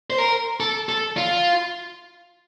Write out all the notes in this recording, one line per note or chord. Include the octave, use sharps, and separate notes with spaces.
C5
A#4
A4
A4
F4